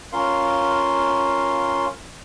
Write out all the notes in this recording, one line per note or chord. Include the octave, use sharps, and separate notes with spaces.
C#4 F4 A#4 F5 C6